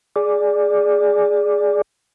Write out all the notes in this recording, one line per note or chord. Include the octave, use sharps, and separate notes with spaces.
G#4 D5